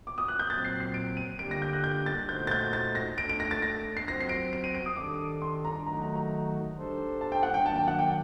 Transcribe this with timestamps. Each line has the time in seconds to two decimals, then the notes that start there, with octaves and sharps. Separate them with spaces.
0.07 D6
0.18 D#6
0.28 F#6
0.39 G6
0.50 A#2 F#3 C4 A6
0.65 C7
0.80 C7
0.94 D7
1.17 D#7
1.39 D3 G3 A#3 D4 G4 D7
1.51 A#6
1.62 G6
1.73 F#6
1.84 G6
2.06 A6
2.29 A#2 A3 D#4 F#4 C5 G6
2.47 A6
2.51 G6
2.73 A6
2.95 A#6
3.18 A3 D4 A4 D7
3.29 D7
3.40 A#6
3.51 A6
3.62 A#6
3.97 C7
4.08 F#3 C4 F#4 C5 A#6
4.20 C7
4.29 D7
4.53 D7
4.64 D#7
4.75 D7
4.86 D#6
4.96 D#3 G3 D4 A4 D6
5.42 C6
5.65 A#5
5.86 D#3 F#3 A3 D#4 F#4 A#5
6.02 A#5
6.16 A#5
6.75 G3 D4 A4 C5
7.21 A5
7.32 G5
7.43 F#5
7.54 G5
7.65 D#3 F#3 A#3 D4 A5
7.76 G5
7.88 F#5
7.99 G5